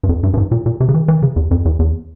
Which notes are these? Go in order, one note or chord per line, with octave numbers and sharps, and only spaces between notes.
G2
F2
G2
G2
G#2
A#2
A#2
C3
C#3
E3
E3
C#3
E2
F2
E2
E2